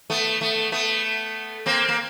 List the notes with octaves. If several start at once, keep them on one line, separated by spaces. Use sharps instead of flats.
A3 B3
A3 B3
A3 B3
A#3 C4
A#3